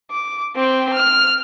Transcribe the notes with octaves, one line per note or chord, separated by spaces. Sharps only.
D6
C4 G5
F6